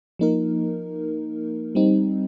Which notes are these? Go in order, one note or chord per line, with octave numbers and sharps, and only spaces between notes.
F3 A#3 D#4 A#4
G3 C4 D#4